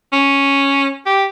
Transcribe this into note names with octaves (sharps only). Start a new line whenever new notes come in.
C#4
G4